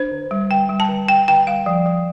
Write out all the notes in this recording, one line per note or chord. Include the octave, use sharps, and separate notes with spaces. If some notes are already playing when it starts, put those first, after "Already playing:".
Already playing: D4 C5
D3
G3
D3 G5
G3
A5
D3
D3 G5
D3 G5
G3 F5
F3
F3